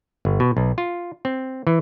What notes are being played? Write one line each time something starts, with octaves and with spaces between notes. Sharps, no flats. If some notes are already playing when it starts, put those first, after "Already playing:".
G1
B2
B1
F4
C4
E3